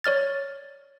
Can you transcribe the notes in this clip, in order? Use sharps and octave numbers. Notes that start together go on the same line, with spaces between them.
C#5 D5 F6 A6